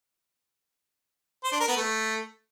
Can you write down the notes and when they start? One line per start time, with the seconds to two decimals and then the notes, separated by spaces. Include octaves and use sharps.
1.44 C5
1.52 D4
1.60 A#4
1.68 B3
1.76 A3